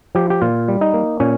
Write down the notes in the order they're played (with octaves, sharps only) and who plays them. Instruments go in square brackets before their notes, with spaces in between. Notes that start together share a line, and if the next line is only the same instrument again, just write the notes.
[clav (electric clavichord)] F3 G4
G4
A#2 F4
G3
D#4
A#3
A#2 C#4